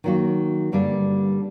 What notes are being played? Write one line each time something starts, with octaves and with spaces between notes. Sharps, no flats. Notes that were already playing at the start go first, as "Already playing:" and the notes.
D#3 F#3 A#3 F#4
G2 D3 G3 A#3 D4